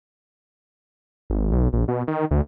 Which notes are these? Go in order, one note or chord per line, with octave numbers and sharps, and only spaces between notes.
G#1
B1
A#1
B2
D#3
D2